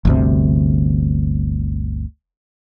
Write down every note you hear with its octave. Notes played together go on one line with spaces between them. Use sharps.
G1 D2 C3